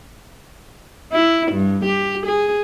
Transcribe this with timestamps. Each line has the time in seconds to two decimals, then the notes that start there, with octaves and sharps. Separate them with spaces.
1.13 E4
1.52 G2
1.85 G4
2.27 G#4